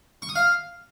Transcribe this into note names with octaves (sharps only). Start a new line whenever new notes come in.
C#6
D#6
F5